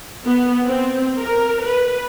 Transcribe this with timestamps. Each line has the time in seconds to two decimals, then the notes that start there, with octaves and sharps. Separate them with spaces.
0.25 B3
0.66 C4
1.19 A#4
1.66 B4